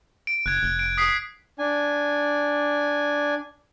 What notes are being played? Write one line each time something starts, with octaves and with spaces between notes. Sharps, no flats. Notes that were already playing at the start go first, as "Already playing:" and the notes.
D7
F#1 F#6 G#6
F1
D7
D#6 B6 C7
D4 G#5